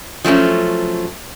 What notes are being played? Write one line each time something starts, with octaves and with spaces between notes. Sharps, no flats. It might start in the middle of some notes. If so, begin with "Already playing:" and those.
F3 F#3 A3 C#4